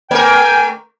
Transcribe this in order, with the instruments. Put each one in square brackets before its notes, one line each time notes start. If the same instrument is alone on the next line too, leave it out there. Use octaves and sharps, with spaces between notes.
[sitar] A3 A#4 [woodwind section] G5 G#5